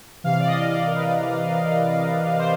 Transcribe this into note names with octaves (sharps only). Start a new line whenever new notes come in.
C3 E3 F5
D5
D#5
D#5
D5
A#4
B4
C5